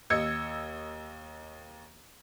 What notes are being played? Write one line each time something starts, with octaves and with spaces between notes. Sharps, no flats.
D#2 D#5 E6 G#6 C#7